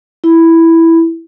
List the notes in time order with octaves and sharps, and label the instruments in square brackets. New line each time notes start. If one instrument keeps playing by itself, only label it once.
[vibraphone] E4